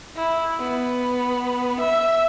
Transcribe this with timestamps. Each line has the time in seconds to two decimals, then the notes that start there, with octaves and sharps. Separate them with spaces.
0.16 E4
0.59 B3
1.81 E5